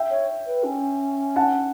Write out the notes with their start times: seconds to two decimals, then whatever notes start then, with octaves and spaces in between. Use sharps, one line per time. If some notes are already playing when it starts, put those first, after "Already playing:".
Already playing: E5 G5
0.10 C#5
0.46 B4
0.64 C#4
1.36 F#5 A5